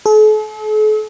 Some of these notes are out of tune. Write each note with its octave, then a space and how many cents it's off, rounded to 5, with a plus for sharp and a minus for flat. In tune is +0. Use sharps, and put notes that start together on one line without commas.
A4 -45